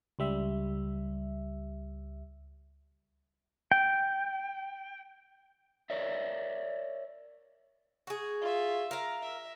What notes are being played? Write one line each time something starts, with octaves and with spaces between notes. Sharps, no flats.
C#2 G3 E5
G5
A#4 C#5 D5 E5
F#4 G#4
F4 E5
A#4 F5
E5